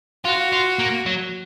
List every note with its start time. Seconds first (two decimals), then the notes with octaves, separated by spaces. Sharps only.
0.25 F4 F#4
0.53 F4
0.79 A#3
1.06 F#3